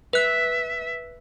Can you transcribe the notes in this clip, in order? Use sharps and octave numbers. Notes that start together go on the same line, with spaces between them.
B4 E5 F#6